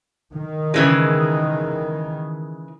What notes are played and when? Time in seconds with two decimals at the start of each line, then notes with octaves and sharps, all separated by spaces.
0.33 D#3
0.74 C#3 E3 G#3